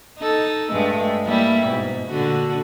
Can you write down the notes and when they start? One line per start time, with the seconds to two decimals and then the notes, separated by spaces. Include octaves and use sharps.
0.18 D#4 A4
0.72 G2 G#3 A3
1.25 G3 A#3 E4
1.67 G#2 B2
2.07 A#2 D3 F#4